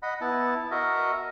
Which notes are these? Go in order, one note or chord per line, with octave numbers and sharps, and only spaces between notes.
D#5 F#5 B5
B3 E4 A5
F#4 A#4 D#5 E5